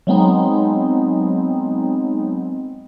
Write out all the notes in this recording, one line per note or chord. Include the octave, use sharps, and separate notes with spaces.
F#3 G#3 B3 C4 D#4